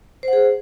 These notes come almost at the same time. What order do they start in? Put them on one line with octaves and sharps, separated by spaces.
C5 F#5 G#4